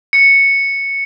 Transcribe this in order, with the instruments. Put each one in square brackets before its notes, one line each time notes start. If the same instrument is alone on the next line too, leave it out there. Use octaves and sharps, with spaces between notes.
[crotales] C#7